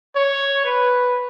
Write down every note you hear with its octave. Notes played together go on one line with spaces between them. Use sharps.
C#5
B4